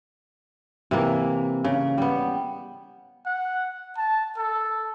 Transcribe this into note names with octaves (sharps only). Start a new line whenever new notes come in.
C3 E3 A#3
C#3
G3 B3
F#5
A5
A4